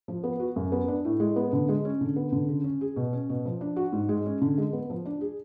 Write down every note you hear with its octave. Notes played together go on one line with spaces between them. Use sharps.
F3
B3
F#4
F#2
B3
D4
A2
G#3
B3
D3
G#3
C#4
D3
B3
D3
C#3
C#4
G#4
B2
C#4
B2
F3
D4
F#4
G#2
G#3
C#4
D3
G#3
B3
F3
D4
G#4